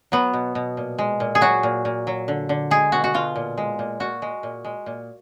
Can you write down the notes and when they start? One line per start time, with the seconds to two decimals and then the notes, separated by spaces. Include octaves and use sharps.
0.12 F#3 B3
0.33 B2
0.55 B2
0.77 A#2
0.98 G#3
1.20 A#2
1.35 G#4
1.41 F#3 F#4
1.63 A#2
1.85 A#2
2.07 F#3
2.28 D3
2.49 D3
2.71 G#3 G#4
2.92 B2 F#4
3.04 F#4
3.14 B2 F4
3.36 A#2
3.57 G#3
3.79 A#2
4.00 A#2 F#4
4.22 G#3
4.43 A#2
4.64 G#3
4.86 A#2